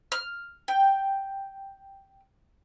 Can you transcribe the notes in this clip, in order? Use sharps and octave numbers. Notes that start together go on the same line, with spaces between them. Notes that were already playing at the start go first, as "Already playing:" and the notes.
F6
G5